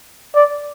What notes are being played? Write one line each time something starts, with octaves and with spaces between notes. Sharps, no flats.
D5